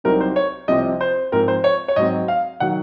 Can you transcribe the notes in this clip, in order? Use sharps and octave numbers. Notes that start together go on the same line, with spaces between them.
C2 C3 F#3 C4 D#4 A#4
C5
C#5
C2 C3 F3 C4 D#5
C5
G#2 F3 C4 A#4
C5
C#5
C#5
G#2 F#3 C4 D#5
F5
D#3 F#3 F#5